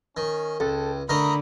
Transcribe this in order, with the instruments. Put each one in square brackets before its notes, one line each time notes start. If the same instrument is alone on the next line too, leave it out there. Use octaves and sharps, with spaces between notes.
[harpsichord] D#3 [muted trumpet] C#4
[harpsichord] C#2 [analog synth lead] A4 [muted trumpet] G5
[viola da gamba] D3 [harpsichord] A3 A#4 D#5 [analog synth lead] A#5 [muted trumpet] B5